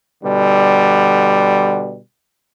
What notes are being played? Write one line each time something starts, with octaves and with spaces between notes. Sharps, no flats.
B2 D3 G3